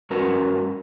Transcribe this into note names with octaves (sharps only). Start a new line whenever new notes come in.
G2 C#4 F#4 A#4 B4